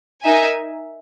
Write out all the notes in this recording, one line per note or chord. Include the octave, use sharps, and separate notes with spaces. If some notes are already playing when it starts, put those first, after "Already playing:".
D#4 A#4 E5 G#5